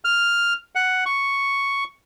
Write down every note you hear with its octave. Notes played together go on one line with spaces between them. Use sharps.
F6
F#5
C#6